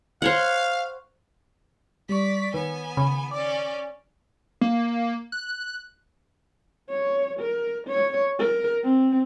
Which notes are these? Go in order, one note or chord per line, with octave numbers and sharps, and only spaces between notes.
C5 C#5 F5 F#5
G3 D5 C#6 B6
D#3 B3 B4 C#5 G#5
C#3 B5
C#4 D5 D6
A#3
F#6
C#5
A#4
C#5
A#4
C4